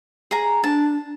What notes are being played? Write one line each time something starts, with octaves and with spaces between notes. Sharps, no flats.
G#4 A#5
D4 A5